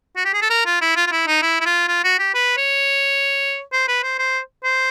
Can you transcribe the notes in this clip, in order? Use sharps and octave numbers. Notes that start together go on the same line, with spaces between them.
F#4
G4
G#4
A4
A#4
F4
E4
F4
F4
E4
D#4
E4
E4
F4
F4
F#4
G4
B4
C#5
C5
B4
C5
C5
C5